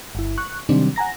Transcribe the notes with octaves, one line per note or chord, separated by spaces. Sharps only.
G1 E4
C#6 F#6
C3 D#3 F#3 G3 C4 D4
F#5 G#5 A#5 A#6